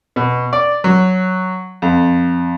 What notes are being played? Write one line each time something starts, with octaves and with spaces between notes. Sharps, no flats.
B2
D5
F#3
F2